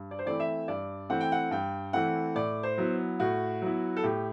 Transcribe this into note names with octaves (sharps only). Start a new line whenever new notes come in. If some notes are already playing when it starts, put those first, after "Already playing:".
Already playing: G2
D5
C5
E3 A3 C4 E4 D5
E5
G2 D5
E3 A3 C4 E4 F#5
G5
F#5
G2 G5
E3 A3 C4 E4 F#5
A2 D5
C5
F#3 B3 E4
A2 F#4
F#3 B3 E4
A4
A2 G4